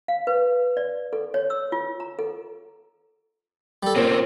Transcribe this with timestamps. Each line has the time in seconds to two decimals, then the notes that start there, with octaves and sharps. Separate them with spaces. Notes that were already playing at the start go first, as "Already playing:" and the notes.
0.08 F5
0.27 B4
0.77 D5
1.13 A4
1.34 C#5
1.50 E6
1.72 F4
2.00 A#5
2.19 A4
3.83 G3 A4
3.96 A#2 C4 C#4